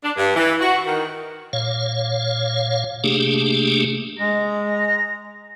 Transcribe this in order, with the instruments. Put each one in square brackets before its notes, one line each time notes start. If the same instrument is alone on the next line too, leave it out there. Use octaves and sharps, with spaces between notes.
[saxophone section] D4
G2
E3
F#4
D#3
[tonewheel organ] A#2 C#5 F5
C3 A3 A#3 D4 G4 G#4
[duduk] G#3 [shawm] A#5